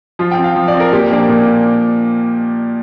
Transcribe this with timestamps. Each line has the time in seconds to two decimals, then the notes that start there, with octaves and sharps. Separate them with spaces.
0.19 F3 F4
0.31 G5
0.38 C4
0.44 F5
0.56 F3
0.68 D5
0.74 C4
0.80 A#4
0.93 A#2 G4
1.11 F3 A#3 D4
1.29 A#2